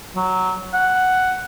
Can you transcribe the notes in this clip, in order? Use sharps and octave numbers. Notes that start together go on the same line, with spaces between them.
F#3
F#5